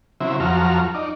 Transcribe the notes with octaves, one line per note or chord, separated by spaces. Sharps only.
C#3 F#3 C4 E4 E5
F2 F3 F#3 F#4 A#5 F6
D#4 D5